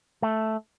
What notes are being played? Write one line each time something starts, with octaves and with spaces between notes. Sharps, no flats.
A3